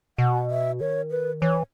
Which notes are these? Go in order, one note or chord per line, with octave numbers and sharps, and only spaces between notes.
B2 F#5
E5
D#3 C#5
B4
E3 C#5